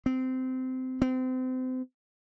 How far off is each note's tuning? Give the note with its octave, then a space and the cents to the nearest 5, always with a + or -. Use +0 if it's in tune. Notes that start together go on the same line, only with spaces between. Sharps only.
C4 -20
C4 -30